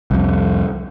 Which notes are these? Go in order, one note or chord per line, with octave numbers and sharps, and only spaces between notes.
C2 F2